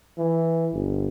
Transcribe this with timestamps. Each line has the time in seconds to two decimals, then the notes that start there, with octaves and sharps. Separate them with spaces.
0.18 E3
0.73 G1